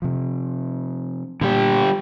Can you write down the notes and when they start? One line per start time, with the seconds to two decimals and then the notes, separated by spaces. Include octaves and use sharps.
0.02 C3 F3
1.41 A#2 D3 G3 G4